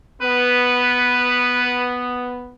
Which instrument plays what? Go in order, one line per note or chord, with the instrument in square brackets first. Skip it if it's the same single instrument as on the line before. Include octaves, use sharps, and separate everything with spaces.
[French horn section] B3 [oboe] B4